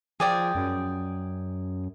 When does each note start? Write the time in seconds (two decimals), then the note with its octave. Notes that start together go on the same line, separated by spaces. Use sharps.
0.20 F3 G#4 D5 G5
0.55 F#2